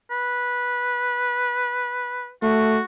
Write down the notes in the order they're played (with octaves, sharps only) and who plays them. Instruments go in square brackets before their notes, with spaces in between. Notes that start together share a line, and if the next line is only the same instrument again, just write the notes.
[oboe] B4
[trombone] A3 [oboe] F#4